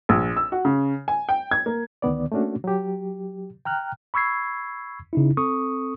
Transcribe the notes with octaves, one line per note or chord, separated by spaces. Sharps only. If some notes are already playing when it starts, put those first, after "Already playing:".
A#1
E6
F#4
C#3
G#5
G5
G#6
A#3
D2 D#3 B3 D5
A3 A#3 C#4 D4 F#4
F#3 G4
G5 A#5 F6 F#6
B5 C#6 E6 G#6 C7
C#3 D#4 E4
C4 A4 C#6 D#6